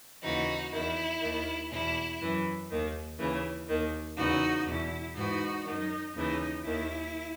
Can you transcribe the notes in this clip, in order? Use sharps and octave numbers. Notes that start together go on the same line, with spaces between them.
D#2 C#3 E3 D#4 F#4
E2 D#3 E4
D#2 D#3
E2 B2 E4
F#2 E3
D#2 D#3
D#2 C#3 E3
D#2 D#3
E2 C#3 E3 D#4 F#4
E2 B2 E4
G#2 E3 D#4 F#4
F#2 D#3 D#4
D#2 C#3 E3 D#4
D#2 D#3 E4